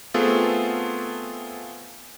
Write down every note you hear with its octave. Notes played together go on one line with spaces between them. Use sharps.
A3 B3 C4 F4 G#4 A4